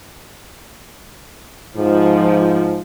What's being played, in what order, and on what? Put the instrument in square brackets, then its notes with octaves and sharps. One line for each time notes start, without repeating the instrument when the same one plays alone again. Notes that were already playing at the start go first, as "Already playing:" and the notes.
[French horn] G#2 [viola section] F3